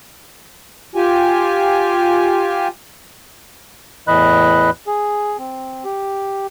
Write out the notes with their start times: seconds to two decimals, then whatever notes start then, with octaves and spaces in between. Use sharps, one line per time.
0.95 F4 G4 G#5
4.08 E2 A2 E3 D#5 B5 F#6
4.87 G#4
5.38 C4
5.85 G4